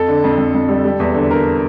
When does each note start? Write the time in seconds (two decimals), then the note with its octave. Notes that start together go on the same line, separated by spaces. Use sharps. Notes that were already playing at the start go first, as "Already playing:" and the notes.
Already playing: F2 A4
0.08 D3
0.24 F2
0.38 F2
0.54 F2
0.69 G3
0.84 G3
1.00 E2
1.14 D3
1.31 D3 A#4